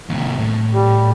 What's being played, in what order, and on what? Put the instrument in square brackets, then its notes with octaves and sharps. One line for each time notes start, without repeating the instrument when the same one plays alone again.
[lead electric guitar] D#2 C3
A2
[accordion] G3